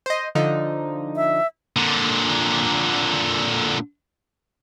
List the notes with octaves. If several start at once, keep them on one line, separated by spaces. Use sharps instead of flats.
C5 D#5
D3 F3 D#4
E5
A#2 D3